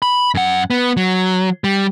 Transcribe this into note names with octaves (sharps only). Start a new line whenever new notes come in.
B5
F#2 F#5
B3
F#3
G3